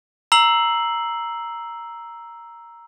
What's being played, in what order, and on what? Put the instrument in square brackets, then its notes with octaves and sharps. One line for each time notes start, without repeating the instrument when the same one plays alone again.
[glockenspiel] A#5 E6 C7 F#7